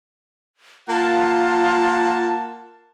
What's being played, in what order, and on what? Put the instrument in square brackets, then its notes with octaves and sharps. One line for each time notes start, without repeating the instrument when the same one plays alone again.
[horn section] A#3 F#5 A5 [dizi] F4